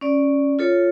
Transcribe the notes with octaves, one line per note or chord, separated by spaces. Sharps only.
C#4 D5
F4 A4 C#5